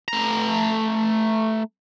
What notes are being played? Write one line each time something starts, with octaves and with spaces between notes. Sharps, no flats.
A3 A#5